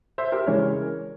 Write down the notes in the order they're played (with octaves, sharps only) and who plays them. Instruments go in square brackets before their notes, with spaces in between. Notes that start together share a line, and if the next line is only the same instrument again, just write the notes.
[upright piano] C5 E5
G4 A#4
C#3 E3 G#3 C#4 A#4 C#5